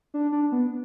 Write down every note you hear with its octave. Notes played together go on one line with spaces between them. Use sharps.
D4
D4
B3